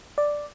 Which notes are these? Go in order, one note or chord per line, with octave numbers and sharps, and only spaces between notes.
D5